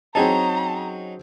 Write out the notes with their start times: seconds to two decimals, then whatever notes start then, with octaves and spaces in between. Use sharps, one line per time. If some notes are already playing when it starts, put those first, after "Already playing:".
0.15 F#3 C4 C#4 D#4 G#4 A5 A#5